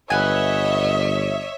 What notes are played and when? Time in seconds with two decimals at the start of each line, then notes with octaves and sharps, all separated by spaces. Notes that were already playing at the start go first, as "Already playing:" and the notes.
0.10 G1 B4 C#5 D#5 E5 F#5 G#5